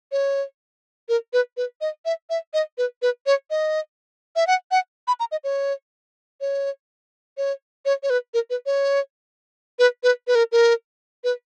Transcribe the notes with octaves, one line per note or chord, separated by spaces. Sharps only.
C#5
A#4
B4
B4
D#5
E5
E5
D#5
B4
B4
C#5
D#5
E5
F#5
F#5
B5
A#5
D#5
C#5
C#5
C#5
C#5
C#5
B4
A#4
B4
C#5
B4
B4
B4
A#4
A#4
B4